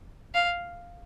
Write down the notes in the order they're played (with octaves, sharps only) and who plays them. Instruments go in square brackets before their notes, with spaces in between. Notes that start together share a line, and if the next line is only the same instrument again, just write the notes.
[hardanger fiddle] F5